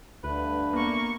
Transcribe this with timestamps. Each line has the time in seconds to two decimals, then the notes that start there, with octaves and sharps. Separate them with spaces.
0.24 D2 G2 D3 A3 B4
0.73 A#3 B3 C#6